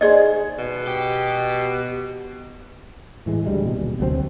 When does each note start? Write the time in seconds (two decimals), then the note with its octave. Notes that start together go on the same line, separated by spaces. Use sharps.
0.01 D#4 G#4 C5 D5 D#5
0.58 B2
0.87 G4
3.26 A2 E3 G#3
3.46 D2 G3 G#3
3.64 D#1 B2
4.00 D2 F#3 G#3 C4